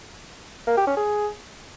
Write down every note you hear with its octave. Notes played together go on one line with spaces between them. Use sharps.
A#3
G4
C#4
G#4